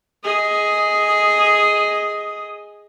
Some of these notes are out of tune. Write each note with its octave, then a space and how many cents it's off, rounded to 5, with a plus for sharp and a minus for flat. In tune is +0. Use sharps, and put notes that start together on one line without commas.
G#4 +0 D#5 +10